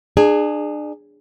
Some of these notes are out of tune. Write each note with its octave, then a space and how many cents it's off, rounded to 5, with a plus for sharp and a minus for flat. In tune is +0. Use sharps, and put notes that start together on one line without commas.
D4 +35 G#4 +0